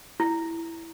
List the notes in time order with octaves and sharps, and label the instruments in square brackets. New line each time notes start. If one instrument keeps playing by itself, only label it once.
[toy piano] E4